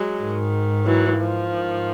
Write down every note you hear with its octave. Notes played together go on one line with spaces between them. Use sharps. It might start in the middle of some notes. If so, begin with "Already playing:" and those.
Already playing: F#3 G#3
G#2 D#3
E3 F#3
F3
D#3
G#2